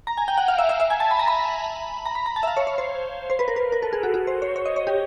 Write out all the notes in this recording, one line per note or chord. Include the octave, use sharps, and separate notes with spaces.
A#5
G#5
G5
F#5
F5
E5
E5
E5
G#5
A5
B5
A#5
B5
A#5
B5
A#5
A5
E5
F5
C#5
C#5
C5
C5
B4
A#4
B4
A#4
A4
G#4
F#4
F#4
C5
C#5
C#5
D#5
C#5
G4